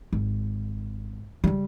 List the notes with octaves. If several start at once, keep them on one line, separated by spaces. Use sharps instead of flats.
G#1
C#3 G3